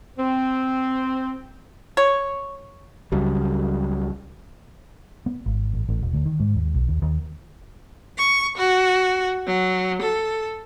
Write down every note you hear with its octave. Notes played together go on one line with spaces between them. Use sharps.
C4
C#5
C#2 C#3 F#3 G3
B3
G#1
A1
A1
E1
D2
D#3
G#2
D#2
B1
D#2
D#2
C#6
F#4
F#3
A4